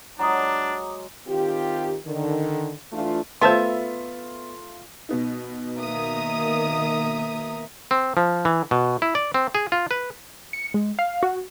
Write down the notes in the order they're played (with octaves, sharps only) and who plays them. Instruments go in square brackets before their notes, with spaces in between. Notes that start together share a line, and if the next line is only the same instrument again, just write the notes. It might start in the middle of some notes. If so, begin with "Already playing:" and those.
[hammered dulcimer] F#3 G#3 [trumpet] D4 [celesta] A#5 D6 D#6
[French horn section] D#3 C4 F4 G4
D3 D#3
E3 A3 D4 F4
[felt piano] A3 F4 [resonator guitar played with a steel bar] B3 E5 [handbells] C5 A5 C6
[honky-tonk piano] B2 B3 D#4
[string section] D#3 A#3 D#6 [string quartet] E5 A#5
[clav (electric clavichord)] C4
F3
E3
B2
E4
D5
C4
G#4
F4
B4
[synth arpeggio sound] C#7
G#3
F5
F#4